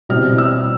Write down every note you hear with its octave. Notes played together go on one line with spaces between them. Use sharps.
B2 G3 C4 E4 F6
E6